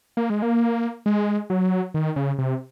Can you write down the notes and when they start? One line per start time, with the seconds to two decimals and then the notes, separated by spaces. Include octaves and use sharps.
0.17 A#3
0.30 G#3
0.42 A#3
1.06 G#3
1.50 F#3
1.94 D#3
2.16 C#3
2.38 C3